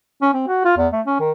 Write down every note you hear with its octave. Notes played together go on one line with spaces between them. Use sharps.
C#4
C4
F#4
F4
E2
A3
C#4
D#3